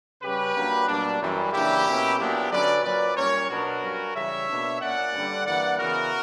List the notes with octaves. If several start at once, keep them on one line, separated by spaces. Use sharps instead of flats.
C#3 G3 C#4 G4 B4
G2 F#3 A#3 D4
B2 G3 A#3 D4
F#2 E3 G3
C#3 E3 A#3 D4 E4 G4
B2 A#3 C#4
A#2 F#3 B3 D4 E4 G4
D3 F#3 C#4 B4 D5
A#2 F#3 C#4 B4 D5
A#2 G3 C#4 A#4 C#5
B2 F#3 B3 D4 F#4 A#4
G2 F#3 C#4
C#3 E3 G3 C#5 E5
B2 A#3 D4
A#2 A#3 C#4 D5 F#5
G2 D3 G3
G2 E3 A#3 D5 F#5
C#3 E3 B3 F#4 A#4